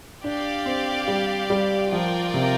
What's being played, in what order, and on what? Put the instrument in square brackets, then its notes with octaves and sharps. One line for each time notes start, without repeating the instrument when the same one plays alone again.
[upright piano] D4 [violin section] G4 D5 F5
[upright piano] C4
G3
G3
[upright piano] F3 [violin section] F4 A#4 D5 G5
[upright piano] C3